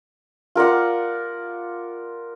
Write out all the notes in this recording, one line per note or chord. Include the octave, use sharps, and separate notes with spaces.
F4 A#4 D5 F#5